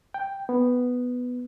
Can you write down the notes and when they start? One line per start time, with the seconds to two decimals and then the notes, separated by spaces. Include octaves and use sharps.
0.14 G5
0.49 B3